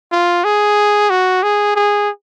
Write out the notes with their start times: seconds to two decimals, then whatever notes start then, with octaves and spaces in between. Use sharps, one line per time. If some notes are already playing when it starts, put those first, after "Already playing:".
0.12 F4
0.44 G#4
1.10 F#4
1.43 G#4
1.75 G#4